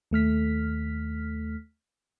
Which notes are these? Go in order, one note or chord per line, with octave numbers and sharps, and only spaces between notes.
D#2 A3 F6 B6